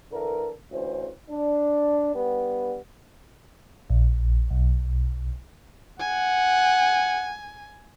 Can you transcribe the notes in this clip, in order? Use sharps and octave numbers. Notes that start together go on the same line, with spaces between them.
D3 E3 A4 A#4
A1 D2 E3 C#4 C5
D4
G2 G3 B3
A#1
B1
F#5 G#5